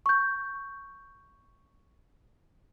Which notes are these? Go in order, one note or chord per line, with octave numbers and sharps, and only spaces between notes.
C#6 G6